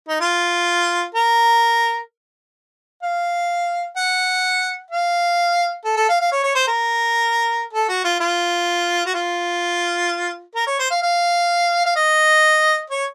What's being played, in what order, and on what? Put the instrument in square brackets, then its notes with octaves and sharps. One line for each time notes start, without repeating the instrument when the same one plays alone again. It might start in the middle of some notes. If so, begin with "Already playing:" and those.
[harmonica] D#4
F4
A#4
F5
F#5
F5
A4
A4
F5
F5
C#5
C#5
C5
A#4
A4
F#4
F4
F4
F#4
F4
A#4
C#5
C5
F5
F5
F5
D#5
C#5